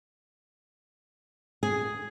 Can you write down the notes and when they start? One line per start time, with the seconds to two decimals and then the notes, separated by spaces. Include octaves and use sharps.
1.63 G#4